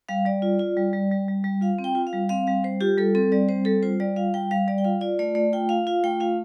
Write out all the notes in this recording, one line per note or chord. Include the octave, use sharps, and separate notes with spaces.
G3 F5
G3 D5
F4
F4
G3
G3
G3
G3
G3
F4 F5
C4
G5
F4
F5
G3
C4 F5
G3 F5
G3 C5
F4 G4
G3 A4
C4 A4
G3 D5
C4 C5
G3 A4
F4 C5
G3 D5
F4 F5
G3 G5
G3 F5
G3 D5
G5
F4 F5
F4 D5
A3 D5
A3 D5
F4 G5
F4 F5
F4 F5
A3 G5
F4 F5